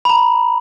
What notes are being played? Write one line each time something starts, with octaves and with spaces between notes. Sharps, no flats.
B5
A#5